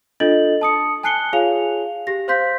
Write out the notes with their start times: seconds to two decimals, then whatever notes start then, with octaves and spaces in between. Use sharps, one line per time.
0.20 D4 F4 A4 D#5 A6 F#7
0.61 A5 D#6 C#7
1.03 G#5 A5 F#6 C7 C#7 G7
1.33 F4 G#4 C#5 F5 G#5 F7
2.07 G4 A#6
2.28 C5 F5 C6 G6 B6